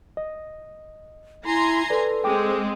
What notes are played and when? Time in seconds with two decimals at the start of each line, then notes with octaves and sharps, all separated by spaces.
0.17 D#5
1.45 E4 G#5 A#5 C6
1.90 A4 B4 D5
2.24 G#3 C4 G5 D6